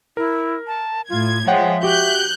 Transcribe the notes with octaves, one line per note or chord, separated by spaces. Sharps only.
E4 A#4
A5
A2 F4 G#6
F3 G#3 C#5 E5 F#5 G5
F#4 G4 F#6 G6